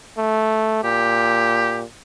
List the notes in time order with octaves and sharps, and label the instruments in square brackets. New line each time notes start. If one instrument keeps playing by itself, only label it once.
[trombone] A3
[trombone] A#2 [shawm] G4